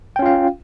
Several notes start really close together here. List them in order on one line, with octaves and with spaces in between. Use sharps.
G5 C#4 F4 F5